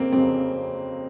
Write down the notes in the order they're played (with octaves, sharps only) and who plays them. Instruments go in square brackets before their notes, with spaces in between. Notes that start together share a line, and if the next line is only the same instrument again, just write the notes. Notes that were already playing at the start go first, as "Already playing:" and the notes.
Already playing: [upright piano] F2 C#3 F#3 [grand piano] A#3 C4
[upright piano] F2 C#3 F#3 [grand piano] C4